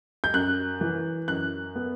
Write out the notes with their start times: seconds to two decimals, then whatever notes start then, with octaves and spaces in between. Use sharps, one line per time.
0.24 G6
0.34 F#2 F#6
0.81 E3
1.28 F#2 F#6
1.76 B3